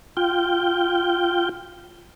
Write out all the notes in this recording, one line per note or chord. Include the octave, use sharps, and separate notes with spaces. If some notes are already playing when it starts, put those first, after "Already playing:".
F4 G5